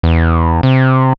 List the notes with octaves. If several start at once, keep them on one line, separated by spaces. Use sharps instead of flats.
E2
C3